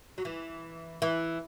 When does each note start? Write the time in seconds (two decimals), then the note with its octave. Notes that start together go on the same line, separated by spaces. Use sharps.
0.18 F#3
0.25 E3
1.02 E3